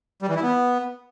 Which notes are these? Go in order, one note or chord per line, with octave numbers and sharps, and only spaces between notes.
G3
E3
E4
B3